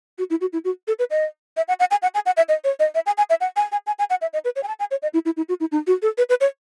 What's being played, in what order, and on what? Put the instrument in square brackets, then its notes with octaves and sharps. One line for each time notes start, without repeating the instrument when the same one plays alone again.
[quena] F#4
E4
F#4
E4
F#4
A4
B4
D#5
E5
F#5
F#5
G#5
F#5
G#5
F#5
E5
D#5
C#5
D#5
E5
G#5
G#5
E5
F#5
G#5
G#5
G#5
G#5
F#5
E5
D#5
B4
C#5
G#5
A5
G#5
C#5
D#5
E4
E4
E4
F#4
E4
D#4
F#4
A4
B4
B4
C#5